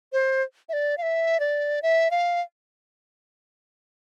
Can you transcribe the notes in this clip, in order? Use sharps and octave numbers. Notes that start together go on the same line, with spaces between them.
C5
E5
D5
F5
E5
D5
E5
F5